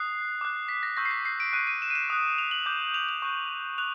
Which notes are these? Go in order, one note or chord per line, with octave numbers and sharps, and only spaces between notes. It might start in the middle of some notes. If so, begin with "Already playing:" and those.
Already playing: D#6 F#6 C7
D6 F#6
B6
A#6
C#6 E6 G6 A#6
C7
B6
C7
D7
C#6 F#6 D#7
D#7
E7
D#7
E7
D#6 F#6
F7
F#7
D6 G6
F7
F7
C#6 F#6
F#6 F7